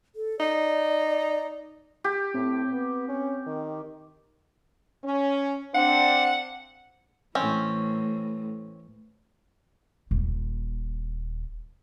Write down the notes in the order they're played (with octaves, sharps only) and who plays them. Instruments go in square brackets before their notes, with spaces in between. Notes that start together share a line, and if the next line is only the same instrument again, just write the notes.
[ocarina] A4
[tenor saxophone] D#4 [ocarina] D5
[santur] G4
[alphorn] A2 [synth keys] C4
[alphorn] B3
C#4
D#3
[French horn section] C#4
[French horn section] C4 D4 [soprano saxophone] F#5
[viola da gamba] A2 E3 [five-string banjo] C4 C#4
[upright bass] D#1 A#3